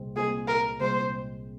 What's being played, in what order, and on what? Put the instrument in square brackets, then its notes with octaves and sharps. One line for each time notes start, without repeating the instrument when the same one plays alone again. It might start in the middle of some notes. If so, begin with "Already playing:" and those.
Already playing: [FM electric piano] C2 A#2 G#3 C4
[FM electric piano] C2 A#2 G#3 C4 [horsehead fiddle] G#4
[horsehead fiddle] A#4
[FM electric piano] C2 A#2 G#3 C4 [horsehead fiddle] C5